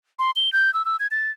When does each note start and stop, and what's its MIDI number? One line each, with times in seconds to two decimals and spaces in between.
0.19 0.31 84
0.36 0.52 103
0.53 0.73 91
0.74 0.85 88
0.85 0.96 88
1.00 1.07 92
1.11 1.31 93